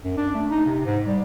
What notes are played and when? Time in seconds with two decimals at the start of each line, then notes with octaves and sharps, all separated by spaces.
0.04 F#2
0.17 D4
0.35 A3
0.50 D#4
0.66 C3
0.85 G#2
1.06 G3